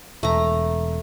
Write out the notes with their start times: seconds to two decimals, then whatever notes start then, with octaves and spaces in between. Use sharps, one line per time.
0.23 E1 A3 A#5